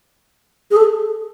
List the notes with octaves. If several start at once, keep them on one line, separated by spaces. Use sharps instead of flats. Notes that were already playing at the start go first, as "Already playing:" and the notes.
G#4
A4